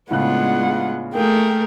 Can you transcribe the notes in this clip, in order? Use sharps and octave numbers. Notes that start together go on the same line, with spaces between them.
A2 C#3 G#3 B3 D4 F4 F#5 F#6
A3 A#3 G#4 A#4 G5